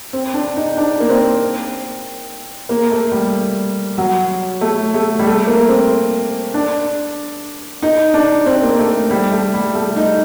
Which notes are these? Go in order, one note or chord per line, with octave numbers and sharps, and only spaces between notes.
C4
D4
D#4
D4
A#3
C4
A#3
A3
G3
F#3
A3
A3
G3
A3
A#3
C4
D4
D#4
D4
C4
A#3
A3
G3
A3
G3
A3
D#4